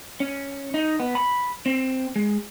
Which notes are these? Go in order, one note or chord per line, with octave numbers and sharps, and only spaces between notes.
C#4
D#4
B3
B5
C4
G#3